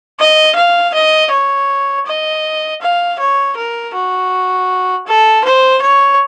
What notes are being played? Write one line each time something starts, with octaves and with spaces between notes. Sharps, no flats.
D#5
F5
D#5
C#5
D#5
F5
C#5
A#4
F#4
A4
C5
C#5